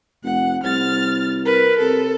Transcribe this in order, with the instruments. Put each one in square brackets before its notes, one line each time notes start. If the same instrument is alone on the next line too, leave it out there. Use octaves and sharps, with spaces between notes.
[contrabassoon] F1 [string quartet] F#5
[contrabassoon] C2 [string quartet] F6 A6
[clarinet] A#4 [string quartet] B4
[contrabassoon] C3 [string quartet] A4